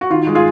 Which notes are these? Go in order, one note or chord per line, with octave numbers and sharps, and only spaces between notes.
F#4
D#3 F4
G#3
F4 G#4